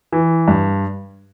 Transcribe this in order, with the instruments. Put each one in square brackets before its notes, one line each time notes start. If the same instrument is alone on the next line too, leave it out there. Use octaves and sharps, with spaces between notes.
[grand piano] E3
G2